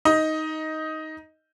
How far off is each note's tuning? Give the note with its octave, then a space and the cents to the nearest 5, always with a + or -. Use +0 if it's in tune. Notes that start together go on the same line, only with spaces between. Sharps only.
D#4 +10 D#5 +10